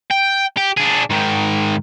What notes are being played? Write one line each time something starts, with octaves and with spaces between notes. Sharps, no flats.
G5
G4
D4 G#4
G#2 D#3